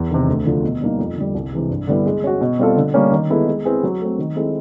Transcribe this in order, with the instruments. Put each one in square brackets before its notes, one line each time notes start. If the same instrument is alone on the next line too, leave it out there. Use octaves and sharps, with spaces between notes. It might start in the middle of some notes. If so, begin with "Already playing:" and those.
Already playing: [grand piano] E2
C3 D#3
D2
D3 F3
B2
G3 A#3 D#4
F2
D3 G3
C2
C3 E3 G#3
G2
D3 G3 B3 E4
G#3
C#4 F#4
B2
G3 C4 F4 A4
D3
G3 A#3 C#4
D#3
G#3 B3 E4 A4
G#3
C4 E4 G#4 B4
F#3
A3 C4
D#3
G#3 C4 E4 A4